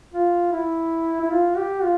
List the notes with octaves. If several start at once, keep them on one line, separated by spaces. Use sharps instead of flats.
F4
E4
E4
F4
G4
F4